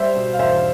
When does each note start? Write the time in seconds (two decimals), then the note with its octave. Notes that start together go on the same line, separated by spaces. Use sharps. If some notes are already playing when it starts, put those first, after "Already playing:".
Already playing: G3 C5 E5
0.16 B2
0.33 F5
0.39 E2 C5 E5